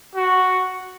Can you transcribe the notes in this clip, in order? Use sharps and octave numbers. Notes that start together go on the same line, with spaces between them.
F#4